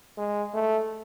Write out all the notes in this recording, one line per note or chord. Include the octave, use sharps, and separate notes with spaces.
G#3
A3